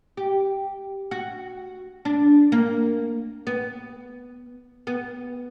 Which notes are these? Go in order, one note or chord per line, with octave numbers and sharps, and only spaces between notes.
G4
F#4
D4
A#3
B3
B3